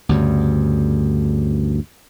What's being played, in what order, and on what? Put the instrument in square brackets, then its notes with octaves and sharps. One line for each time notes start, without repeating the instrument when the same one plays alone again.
[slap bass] D2 G2 C#3